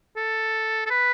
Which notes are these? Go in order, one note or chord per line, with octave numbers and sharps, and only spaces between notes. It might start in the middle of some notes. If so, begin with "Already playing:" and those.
A4
A4
B4